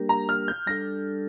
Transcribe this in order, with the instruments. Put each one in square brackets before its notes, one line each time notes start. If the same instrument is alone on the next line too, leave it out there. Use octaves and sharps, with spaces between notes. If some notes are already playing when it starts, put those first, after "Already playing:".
Already playing: [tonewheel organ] G3 A#3 D4 G4 A#4
[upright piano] A#5
F6
G6
[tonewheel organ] G3 D4 A4 [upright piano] A#6